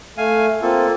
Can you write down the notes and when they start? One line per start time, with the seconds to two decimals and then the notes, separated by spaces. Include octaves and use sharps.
0.17 A3 F5 G#5
0.62 A#3 C4 F4 A4